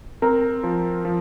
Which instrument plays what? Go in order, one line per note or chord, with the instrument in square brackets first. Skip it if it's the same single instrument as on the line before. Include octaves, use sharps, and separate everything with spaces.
[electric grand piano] C4 [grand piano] A#4
[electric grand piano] F3
F3